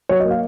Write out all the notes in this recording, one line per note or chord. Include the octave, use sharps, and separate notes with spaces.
F#3 C#5
D#5
A#3
F5